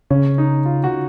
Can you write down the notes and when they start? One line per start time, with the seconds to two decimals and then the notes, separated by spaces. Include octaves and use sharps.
0.10 C#3 C#4
0.38 D#4
0.65 F4
0.84 F#4